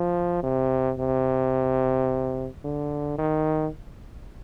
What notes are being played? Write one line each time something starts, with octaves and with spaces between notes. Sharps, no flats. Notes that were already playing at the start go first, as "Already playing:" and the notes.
Already playing: F3
C3
C3
D3
D#3